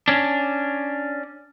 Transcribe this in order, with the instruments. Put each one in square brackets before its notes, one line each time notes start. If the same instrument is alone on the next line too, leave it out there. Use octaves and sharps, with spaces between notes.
[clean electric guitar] C#4 D4